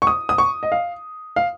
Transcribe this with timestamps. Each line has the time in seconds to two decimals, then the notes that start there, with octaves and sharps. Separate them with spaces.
0.02 C#6
0.07 D#6
0.29 D#6
0.38 C#6
0.63 D#5
0.72 F5
1.36 F5